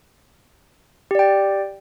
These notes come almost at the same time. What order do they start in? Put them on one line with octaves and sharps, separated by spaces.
G4 D5 G5